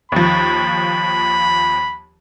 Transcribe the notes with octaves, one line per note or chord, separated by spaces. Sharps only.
D#2 F3 B5